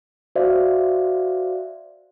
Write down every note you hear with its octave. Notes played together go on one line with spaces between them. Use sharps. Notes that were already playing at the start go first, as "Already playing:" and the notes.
F#4 C5 D5 E5 F5